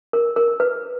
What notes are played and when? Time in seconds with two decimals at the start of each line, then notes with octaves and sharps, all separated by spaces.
0.13 A#4
0.36 A#4
0.60 B4